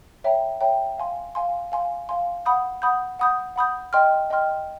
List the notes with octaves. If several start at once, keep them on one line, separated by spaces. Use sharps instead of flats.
C#5 E5 G5 A#5
C#5 E5 G5 A#5
F5 G#5 C6
F5 G#5 C6
F5 G#5 C6
F5 G#5 C6
F#5 B5 D#6 G6
F#5 B5 D#6 G6
F#5 B5 D#6 G6
F#5 B5 D#6 G6
D#5 G5 C6 F6
D#5 G5 C6 F6